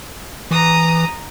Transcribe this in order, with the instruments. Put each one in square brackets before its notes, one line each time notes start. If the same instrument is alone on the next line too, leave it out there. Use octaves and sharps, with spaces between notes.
[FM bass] E3 [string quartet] A#5 D#6